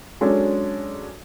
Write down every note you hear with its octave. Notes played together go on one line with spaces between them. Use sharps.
F#3 G#3 C#4 D4 A4